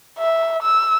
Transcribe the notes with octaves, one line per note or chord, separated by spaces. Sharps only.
E5
E6